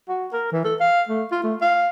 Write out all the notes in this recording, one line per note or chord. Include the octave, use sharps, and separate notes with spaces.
F#4
A#4
E3
A4
F5
A3
F4
A3
F5